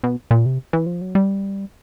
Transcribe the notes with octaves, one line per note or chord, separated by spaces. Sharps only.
B2
A#2
C3
E3
F3
F#3
G3